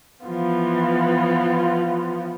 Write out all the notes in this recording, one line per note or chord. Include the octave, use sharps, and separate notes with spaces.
E3 F3 B3 F4